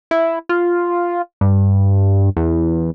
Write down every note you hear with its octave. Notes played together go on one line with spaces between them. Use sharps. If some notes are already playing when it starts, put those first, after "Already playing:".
E4
F4
G2
E2